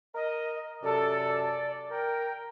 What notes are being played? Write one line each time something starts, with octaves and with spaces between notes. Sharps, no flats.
A#4 D#5
F#2 C3 A4 D5
A#4 G5